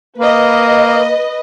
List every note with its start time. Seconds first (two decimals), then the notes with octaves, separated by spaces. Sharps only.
0.18 A#3 B4 D#5